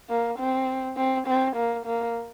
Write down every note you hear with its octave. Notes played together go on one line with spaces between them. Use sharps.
A#3
C4
C4
C4
A#3
A#3